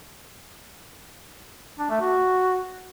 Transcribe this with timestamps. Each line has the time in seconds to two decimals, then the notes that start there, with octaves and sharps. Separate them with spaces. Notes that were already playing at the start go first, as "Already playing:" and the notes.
1.79 D4
1.90 A3
2.01 F#4